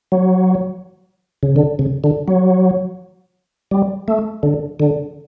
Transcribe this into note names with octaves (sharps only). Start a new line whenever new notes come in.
F#3
C#3
D3
C#3
D3
F#3
G3
A3
D3
D3